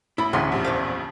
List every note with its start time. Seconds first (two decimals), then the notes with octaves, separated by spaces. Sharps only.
0.18 A1 E4 B5
0.33 A1 D2 G#4 D#5 F#5 C6 B6
0.52 A#1 F2 G3
0.64 E2 C5 F5